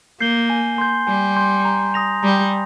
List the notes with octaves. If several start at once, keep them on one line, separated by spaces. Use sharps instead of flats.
A#3 G6 C7 G7
G#5
C6 G6
G3 G#5
C6 G6
A#5
D#6 A#6 F7
G3 A#5